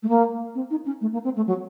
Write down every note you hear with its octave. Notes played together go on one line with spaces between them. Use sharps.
A3
A#3
C4
D#4
C#4
A3
A#3
C4
A3
F#3